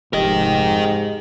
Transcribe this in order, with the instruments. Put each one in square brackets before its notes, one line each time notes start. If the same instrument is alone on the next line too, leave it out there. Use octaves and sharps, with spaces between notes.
[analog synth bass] F1 [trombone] G#2 [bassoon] G4 [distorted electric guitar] A#4 D#5